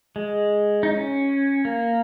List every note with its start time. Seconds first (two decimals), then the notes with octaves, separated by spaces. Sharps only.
0.16 G#3
0.83 D#4
0.91 C#4
1.65 A#3